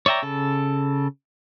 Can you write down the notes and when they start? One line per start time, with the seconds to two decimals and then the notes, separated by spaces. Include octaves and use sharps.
0.06 C#5 D5 E5 G5 A#5
0.22 C#3 A4